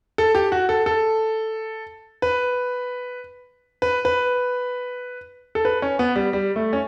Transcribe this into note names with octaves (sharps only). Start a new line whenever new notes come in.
A4
G4
F#4
A4
A4
B4
B4
B4
A4
B4
C#4
B3
G3
G3
A3
C#4